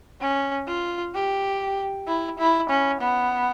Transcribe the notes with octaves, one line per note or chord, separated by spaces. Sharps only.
C#4
F4
G4
E4
E4
C#4
B3